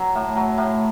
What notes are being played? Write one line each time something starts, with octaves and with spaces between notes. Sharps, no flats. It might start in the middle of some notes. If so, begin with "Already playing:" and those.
Already playing: F#3
A2
F#3
A2